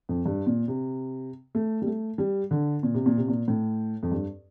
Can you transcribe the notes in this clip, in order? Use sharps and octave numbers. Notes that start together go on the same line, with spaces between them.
F2
G2
A#2
C3
A3
G3
A3
G3
D3
A#2
C3
A#2
C3
A#2
A2
F2
G2